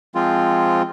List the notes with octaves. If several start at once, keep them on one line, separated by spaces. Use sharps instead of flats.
F3 G#3 C4 F4